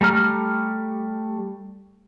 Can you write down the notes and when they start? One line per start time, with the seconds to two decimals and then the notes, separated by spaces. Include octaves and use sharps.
0.01 G3 A3 A#5 F6